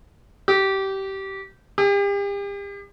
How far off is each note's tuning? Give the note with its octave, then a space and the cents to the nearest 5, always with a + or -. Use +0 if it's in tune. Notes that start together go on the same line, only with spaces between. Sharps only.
G4 -20
G4 +40